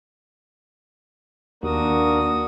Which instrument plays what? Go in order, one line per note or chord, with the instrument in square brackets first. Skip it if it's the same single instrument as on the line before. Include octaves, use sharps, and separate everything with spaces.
[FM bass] D#2 [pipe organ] A#3 D4 A#4 [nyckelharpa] F#4 D#6